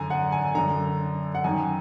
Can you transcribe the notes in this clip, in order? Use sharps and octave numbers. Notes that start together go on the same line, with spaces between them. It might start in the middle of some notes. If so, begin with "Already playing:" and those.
Already playing: F#2 D3 G#5 A#5
F#5
G#5
F#2 D3 A#5
F#5
F#2 D#3 G#5